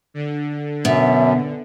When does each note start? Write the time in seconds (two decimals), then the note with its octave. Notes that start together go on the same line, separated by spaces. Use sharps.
0.14 D3
0.85 F#2 B2 E5